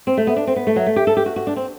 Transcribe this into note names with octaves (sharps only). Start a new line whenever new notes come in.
C4
A3
B3
D4
C4
B3
A3
F#3
A3
G4
A4
G4
F#4
F#4
D4
C4